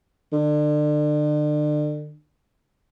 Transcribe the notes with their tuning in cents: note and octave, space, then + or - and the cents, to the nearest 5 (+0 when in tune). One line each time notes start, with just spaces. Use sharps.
D3 +35